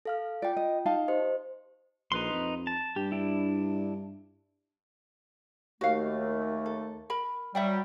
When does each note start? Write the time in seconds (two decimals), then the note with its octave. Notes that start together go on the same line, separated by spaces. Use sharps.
0.05 A4 F5 F6
0.42 F4 D5 G5
0.57 D#5
0.86 D#4 F5 A5
1.08 G4 C5 D#5
2.12 A#1 D#4 B4 C6
2.32 F2
2.67 A5
2.96 G2 G4
3.12 D4 E4
5.81 D#2 A3 F#4 F5
6.66 A4
7.10 A#4 B5
7.55 F#3 G3 E5 F#5 G5